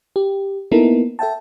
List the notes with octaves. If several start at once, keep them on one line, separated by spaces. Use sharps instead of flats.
G4
A#3 B3 D#4 E4 A4 A#4
A4 E5 G5 A5